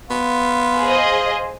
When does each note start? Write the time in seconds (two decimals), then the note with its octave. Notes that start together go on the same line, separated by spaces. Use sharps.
0.11 B3 F5 C6
0.80 G#4 C5 D#5